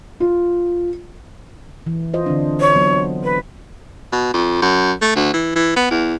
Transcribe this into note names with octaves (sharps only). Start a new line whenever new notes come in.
F4
E3
F4 C5 D#5
D3 C4 D4
C5 C#5
F#3 B3
B4
B2
F2
F#2
A3
D2
E3
E3
B3
E2